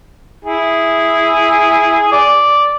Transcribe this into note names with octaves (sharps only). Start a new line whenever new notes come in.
E4 G#4
D5